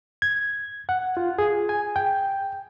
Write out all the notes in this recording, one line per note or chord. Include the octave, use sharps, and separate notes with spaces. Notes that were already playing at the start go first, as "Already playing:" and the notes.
G#6
F#5
F4
G#4
G#5
G5